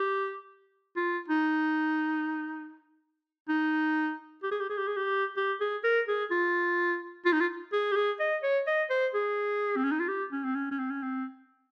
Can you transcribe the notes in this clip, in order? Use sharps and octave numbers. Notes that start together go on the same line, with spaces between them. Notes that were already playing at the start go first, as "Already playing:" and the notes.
Already playing: G4
F4
D#4
D#4
G4
G#4
G4
G#4
G4
G#4
G4
G4
G#4
A#4
G#4
F4
F4
D#4
F4
G#4
G4
G#4
D#5
C#5
D#5
C5
G#4
C4
C#4
D#4
F4
G4
C#4
C4
C#4
C#4
C4
C#4
C4